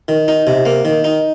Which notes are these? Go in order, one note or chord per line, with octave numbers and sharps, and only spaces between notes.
D#3
D#4
C3
A#3
D#3
D#4